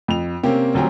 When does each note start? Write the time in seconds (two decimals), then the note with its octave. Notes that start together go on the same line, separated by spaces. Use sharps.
0.08 F2 F7
0.43 C3 A#3 C4 C#4 G4
0.74 D#1 D2 F#3 C4 G4 A#5